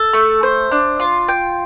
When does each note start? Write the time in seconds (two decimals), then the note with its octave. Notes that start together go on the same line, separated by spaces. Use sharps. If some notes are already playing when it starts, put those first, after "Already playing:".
Already playing: A4
0.13 A3
0.43 C5
0.72 D4
1.00 F4
1.28 G5